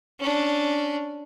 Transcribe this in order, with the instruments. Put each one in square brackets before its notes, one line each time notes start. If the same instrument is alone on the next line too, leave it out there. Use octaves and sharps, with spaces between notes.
[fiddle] C#4 D4